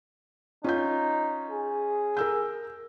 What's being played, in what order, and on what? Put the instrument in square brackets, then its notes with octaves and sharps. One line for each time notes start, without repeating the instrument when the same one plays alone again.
[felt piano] C#4 F4 G6 [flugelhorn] D#4
[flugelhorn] G#4
[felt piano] A#4 E6 G6